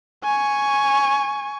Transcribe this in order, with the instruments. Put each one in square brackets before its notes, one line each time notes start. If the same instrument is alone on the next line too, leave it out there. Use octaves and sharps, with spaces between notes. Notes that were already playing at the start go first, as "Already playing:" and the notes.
[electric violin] G#5 C#6